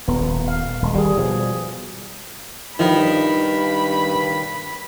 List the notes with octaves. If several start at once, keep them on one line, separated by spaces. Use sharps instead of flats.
D#1 A#2 B3
F5
D#1 G#3
D#3 G3 G#4
B2 F3 G#4
G2 D#3 F3 E4 B5